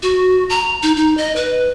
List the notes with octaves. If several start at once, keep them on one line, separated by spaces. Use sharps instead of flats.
F#4
A#5
D#4
D#4
D#5
B4